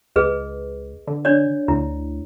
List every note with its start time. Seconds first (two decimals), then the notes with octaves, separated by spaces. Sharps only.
0.16 C#2 G#4 B4 D#5
1.07 D3
1.25 D4 C#5 D5
1.68 D2 E4